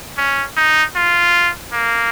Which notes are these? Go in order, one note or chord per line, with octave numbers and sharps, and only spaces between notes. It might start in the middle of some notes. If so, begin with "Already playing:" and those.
C#4
D#4
F4
A#3